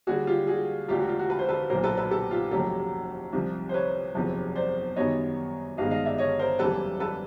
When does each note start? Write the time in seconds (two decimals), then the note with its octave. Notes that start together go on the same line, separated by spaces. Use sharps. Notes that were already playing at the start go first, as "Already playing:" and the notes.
0.07 D#2 D3 G3 F#4 G#4
0.27 F4 G4
0.47 F#4 G#4
0.88 E1 D2 D3 F4 G4
0.99 F#4
1.09 F4
1.19 F#4
1.30 B4
1.39 C5
1.49 A4 B4
1.70 B1 A#2 F#3 A#4 C5
1.84 A4 B4
1.98 A4 B4
2.11 G4 A4
2.31 F4 G4
2.51 F1 D#2 C#3 F#3 A3 G4 A4
3.33 C2 C3 F3
3.69 C5
3.74 B4 C#5
4.15 F#1 E2 C3 F3 G#3
4.56 C5 D5
4.96 F#2 D#3 G3 B3 C#5 D#5
5.78 G#1 G2 D#3 G#3 B3 D#5 F5
5.91 D#5 F5
6.05 D5 E5
6.18 C#5 D#5
6.39 A#4 C5
6.59 F#1 E2 C#3 E3 G3 A4 B4
7.00 A4 B4